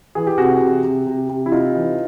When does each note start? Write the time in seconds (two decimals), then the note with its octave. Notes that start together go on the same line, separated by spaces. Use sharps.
0.15 E3 G#4
0.27 G4
0.38 C3 F#4 G#4
0.61 C3
0.84 C3
1.06 C3
1.29 C3
1.46 E4
1.52 C3 D#4 F4
1.75 E3